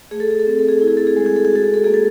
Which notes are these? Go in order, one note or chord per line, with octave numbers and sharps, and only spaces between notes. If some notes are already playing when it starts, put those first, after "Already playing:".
A3 G#4
A4
G#4
A4
C4 G#4
A4
G#4
E4 A4
G#4
A4
G#4
G#3 A4
G#4
A4
G#4
F#4 A4
G#4
A4
A#3 G#4
A4